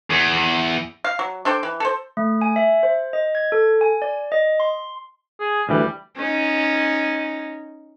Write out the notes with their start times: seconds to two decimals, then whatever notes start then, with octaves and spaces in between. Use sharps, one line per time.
0.10 E2
1.04 F5
1.19 F#3
1.45 D4 A4 C5 G5
1.63 E3
1.80 A4 C5
2.17 A3
2.41 G#5
2.56 E5
2.83 C5
3.13 D#5
3.35 G#6
3.52 A4
3.81 G#5
4.02 D5
4.32 D#5
4.60 C6
5.40 G#4
5.69 D2 E3 G3
6.16 C#4 D#4